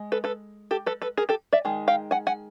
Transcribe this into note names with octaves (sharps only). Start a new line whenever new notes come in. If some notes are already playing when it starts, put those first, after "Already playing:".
Already playing: G#3
A4 B4
A4 B4
G4 A4
A4 B4
A4 B4
G#4 A#4
G4 A4
D5 E5
D#3 G#3
F5 G5
F#5 G#5
F#5 G#5